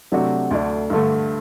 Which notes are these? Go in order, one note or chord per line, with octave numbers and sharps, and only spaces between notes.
C3 F#3 A3 D4 F#4
D2 D3 A3 D4
G2 D3 A3